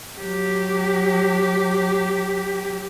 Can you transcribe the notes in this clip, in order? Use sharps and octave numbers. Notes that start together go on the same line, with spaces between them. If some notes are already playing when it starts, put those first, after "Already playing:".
F#3 G4